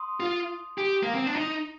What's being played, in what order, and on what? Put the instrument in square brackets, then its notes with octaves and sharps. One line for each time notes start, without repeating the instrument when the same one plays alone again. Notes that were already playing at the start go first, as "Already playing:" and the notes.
Already playing: [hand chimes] C6 D#6
[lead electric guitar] F4
G4
A#3
C4
D4
D#4